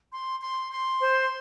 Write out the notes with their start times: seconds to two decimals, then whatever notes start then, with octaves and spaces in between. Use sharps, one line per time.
0.11 C6
0.40 C6
0.71 C6
1.00 C5